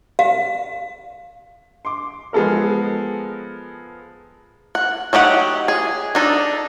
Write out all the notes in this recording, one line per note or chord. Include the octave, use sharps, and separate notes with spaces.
F5
C6 D6
F3 G#3 B3 A4 A#4
F#5
F#3 D#4 G4 F#5
G#4
D4 D#4 A4